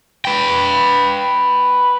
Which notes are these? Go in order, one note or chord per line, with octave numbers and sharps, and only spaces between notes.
B4 G5